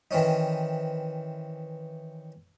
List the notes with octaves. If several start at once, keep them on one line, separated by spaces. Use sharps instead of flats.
D#3 E3 C4 C#4 D#4